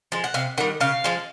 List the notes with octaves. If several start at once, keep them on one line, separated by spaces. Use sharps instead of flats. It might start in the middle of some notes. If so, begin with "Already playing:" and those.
F3 G#3
F#5
C3 F5
D#3 G3 F#5
C#3 F5
F3 G#3